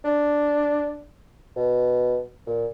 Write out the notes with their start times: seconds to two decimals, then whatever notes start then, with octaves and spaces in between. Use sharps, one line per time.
0.04 D4
1.56 B2
2.47 A#2